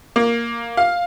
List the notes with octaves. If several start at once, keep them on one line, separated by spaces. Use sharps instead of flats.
A#3
F5